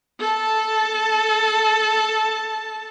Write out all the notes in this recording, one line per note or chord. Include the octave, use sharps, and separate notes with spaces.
A4 A5